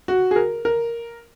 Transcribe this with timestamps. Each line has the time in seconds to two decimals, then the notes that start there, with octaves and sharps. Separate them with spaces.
0.08 F#4
0.31 G#4
0.36 A#4
0.65 A#4